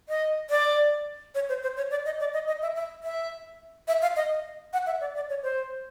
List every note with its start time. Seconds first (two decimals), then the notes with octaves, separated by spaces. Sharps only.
0.09 D#5
0.50 D5
1.35 C#5
1.49 C5
1.62 C5
1.77 C#5
1.91 D5
2.05 D#5
2.20 D5
2.34 D#5
2.47 D#5
2.62 E5
2.76 E5
3.03 E5
3.88 E5
4.02 F5
4.16 D#5
4.73 F#5
4.86 E5
5.01 D5
5.15 D5
5.29 C#5
5.43 C5